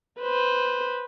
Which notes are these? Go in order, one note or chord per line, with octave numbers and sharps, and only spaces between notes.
B4 C5